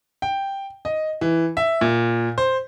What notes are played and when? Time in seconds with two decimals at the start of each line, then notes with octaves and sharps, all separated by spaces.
0.22 G5
0.85 D#5
1.21 E3
1.57 E5
1.81 A#2
2.38 C5